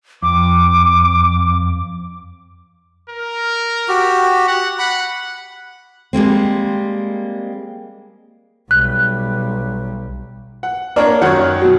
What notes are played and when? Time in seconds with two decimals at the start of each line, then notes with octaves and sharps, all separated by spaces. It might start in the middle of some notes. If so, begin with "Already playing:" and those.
0.22 F2 D6
3.09 A#4
3.88 F#4 G4
4.48 F#5
4.79 F#5 B5
6.13 G3 G#3 A#3 C4
8.71 B1 G3 F#6
10.63 F#5
10.96 A#3 D4 A#4 C#5
11.22 F#2 D#3 C#5 F#5
11.62 B2 F#3